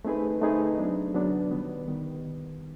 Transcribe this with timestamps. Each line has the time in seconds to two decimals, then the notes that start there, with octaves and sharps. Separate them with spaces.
0.05 A3 C4 D#4 G#4 B4
0.42 A3 C4 D#4 G#4 B4
0.78 F#3 B3 D4
1.14 F#3 B3 D4
1.51 D#3 G3 B3
1.88 D#3 G3 B3